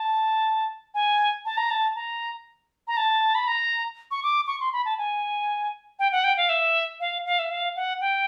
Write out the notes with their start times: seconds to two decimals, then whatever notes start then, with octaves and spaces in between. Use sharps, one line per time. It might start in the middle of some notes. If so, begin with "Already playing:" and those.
Already playing: A5
0.94 G#5
1.45 A5
1.57 A#5
1.71 A5
1.95 A#5
2.88 A#5
2.97 A5
3.35 B5
3.47 A#5
4.11 C#6
4.23 D6
4.47 C#6
4.61 C6
4.73 B5
4.85 A5
4.98 G#5
5.99 G5
6.12 F#5
6.24 G5
6.37 F5
6.49 E5
7.00 F5
7.26 F5
7.39 E5
7.51 F5
7.76 F#5
8.01 G5